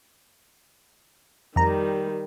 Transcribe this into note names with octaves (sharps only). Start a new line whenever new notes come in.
F2 D#3 G3 A#5